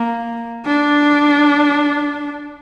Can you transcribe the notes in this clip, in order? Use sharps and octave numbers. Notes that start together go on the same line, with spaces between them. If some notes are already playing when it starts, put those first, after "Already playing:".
Already playing: A#3
D4